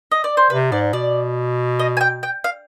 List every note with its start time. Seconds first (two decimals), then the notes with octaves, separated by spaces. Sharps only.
0.11 D#5
0.24 D5
0.37 C5
0.50 C3 B4
0.72 G#2 D5
0.93 B2 D5
1.79 D#5
1.97 G#5
2.01 G5
2.23 G5
2.44 F5